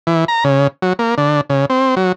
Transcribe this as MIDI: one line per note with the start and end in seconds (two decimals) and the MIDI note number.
0.07 0.25 52
0.28 0.44 82
0.44 0.67 49
0.82 0.93 54
0.99 1.15 58
1.18 1.41 50
1.50 1.66 49
1.70 1.95 60
1.97 2.12 54